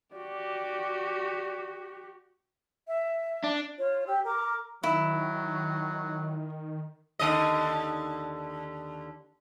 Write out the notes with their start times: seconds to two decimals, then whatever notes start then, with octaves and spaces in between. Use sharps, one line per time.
0.16 F#4 G4 D5
2.88 E5
3.44 D4
3.78 F4 C#5
4.07 G4 E6
4.25 A#4 D6
4.84 D#3 F#3 E4
7.19 D#2 D3 D#5